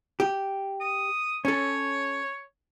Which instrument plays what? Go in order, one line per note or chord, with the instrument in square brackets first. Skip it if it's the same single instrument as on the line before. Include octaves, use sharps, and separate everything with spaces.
[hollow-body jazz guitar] G4
[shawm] D#6
[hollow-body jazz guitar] C#4 A4 [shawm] C#5